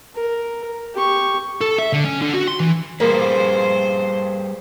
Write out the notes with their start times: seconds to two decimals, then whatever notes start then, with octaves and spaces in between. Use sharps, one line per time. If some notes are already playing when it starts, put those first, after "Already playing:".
0.15 A#4
0.95 G4 C#6
1.61 A4
1.79 E5
1.93 D3
2.05 C#4
2.21 D3
2.33 F#4
2.48 C6
2.60 E3
3.00 G3 A#3 G#4 B4 C5